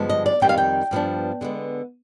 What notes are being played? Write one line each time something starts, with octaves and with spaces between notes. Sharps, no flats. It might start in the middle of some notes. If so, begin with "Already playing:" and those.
Already playing: G2 D3 F3 G#3 B3
D#5
D5
F2 D#3 G3 C4 G5
F5
G5
G2 F3 G#3 B3 D4
D3 G#3 B3